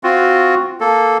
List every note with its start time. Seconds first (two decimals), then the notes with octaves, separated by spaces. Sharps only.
0.04 C4 F4 F#4
0.80 A#3 A4